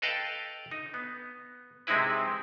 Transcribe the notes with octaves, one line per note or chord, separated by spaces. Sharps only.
A4 B4 D#5 F5 G5 A5
D#4
B3
C3 G#3 C4 D#4 E4 B4